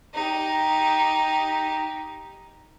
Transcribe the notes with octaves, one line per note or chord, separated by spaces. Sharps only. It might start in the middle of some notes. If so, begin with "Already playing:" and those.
D#4 G4